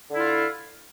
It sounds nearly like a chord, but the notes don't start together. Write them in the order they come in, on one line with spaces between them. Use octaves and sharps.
D3 E4 F4